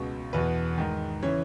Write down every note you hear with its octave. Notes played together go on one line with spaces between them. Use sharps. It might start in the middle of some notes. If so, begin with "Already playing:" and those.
Already playing: C#2 B2
E2 B2 B4
G#2 D#3
C#3 E3 C#5